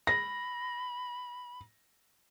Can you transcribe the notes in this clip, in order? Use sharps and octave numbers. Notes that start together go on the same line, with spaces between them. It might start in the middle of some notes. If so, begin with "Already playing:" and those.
B5 A#6